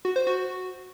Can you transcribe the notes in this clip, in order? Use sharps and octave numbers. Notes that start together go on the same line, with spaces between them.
F#4
C5
F#4